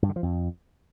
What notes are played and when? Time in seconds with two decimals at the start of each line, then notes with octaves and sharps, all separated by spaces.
0.02 G2
0.09 D3
0.16 F3
0.23 F2